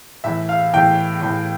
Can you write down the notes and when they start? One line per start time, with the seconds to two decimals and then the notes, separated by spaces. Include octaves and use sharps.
0.24 A2 E3 E5
0.49 F5
0.73 A2 E3 G5
1.22 A2 E3